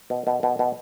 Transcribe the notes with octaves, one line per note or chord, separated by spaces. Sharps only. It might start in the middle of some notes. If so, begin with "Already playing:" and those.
B2
B2
B2
B2